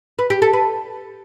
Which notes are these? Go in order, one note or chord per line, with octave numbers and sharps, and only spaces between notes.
B4
G4
A4
B4